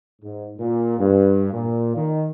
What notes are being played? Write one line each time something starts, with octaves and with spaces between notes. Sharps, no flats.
G#2
A#2
G2
A#2
D#3